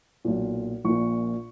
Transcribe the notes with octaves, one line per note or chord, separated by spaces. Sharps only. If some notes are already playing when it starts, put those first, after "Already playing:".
B1 A#2
A#1 A#2 C#6